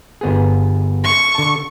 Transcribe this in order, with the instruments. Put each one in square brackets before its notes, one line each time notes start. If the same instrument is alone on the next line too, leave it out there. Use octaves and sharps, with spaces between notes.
[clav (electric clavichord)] G1 B3 G#4
[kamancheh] C#6
[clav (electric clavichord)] D3 A5